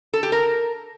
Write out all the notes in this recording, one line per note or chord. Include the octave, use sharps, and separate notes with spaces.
A4
G4
A#4